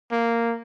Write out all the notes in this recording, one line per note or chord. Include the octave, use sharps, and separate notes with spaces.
A#3